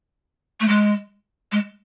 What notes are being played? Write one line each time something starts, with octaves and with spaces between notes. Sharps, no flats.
A3
G#3
G#3